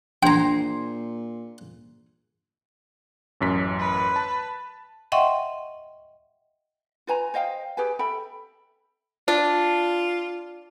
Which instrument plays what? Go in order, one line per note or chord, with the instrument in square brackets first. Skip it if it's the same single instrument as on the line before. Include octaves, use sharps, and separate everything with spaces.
[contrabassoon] A#2 [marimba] D4 [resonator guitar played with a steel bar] G#4 C5 [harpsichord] G5 A#5
[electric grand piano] A1 F#2 B6
[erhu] B4
[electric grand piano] A5
[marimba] D#5 E5 F#5 G5 C6 C#6
[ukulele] F4 B4 G#5 A#5
C5 D#5 F5 G5
G4 G#4 B4 G#5
A4 E5 G5 B5
[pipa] D4 [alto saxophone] F4